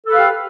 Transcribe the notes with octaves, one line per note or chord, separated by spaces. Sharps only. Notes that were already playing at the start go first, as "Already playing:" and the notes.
G4 A4 B4 F5